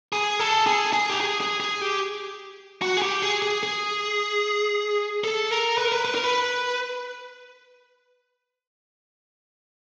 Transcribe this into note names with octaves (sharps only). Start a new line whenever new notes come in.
G#4
A4
G#4
G#4
G4
G#4
G#4
G#4
G4
F#4
G#4
G4
G#4
G#4
G#4
A4
A#4
B4
A#4
B4
B4
A#4
B4